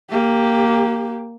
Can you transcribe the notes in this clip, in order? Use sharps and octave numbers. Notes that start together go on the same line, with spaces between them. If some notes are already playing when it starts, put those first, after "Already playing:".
A#3 G4